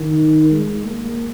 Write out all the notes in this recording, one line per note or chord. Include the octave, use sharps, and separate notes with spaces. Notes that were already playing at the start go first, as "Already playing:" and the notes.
Already playing: D#3
G#3
A#3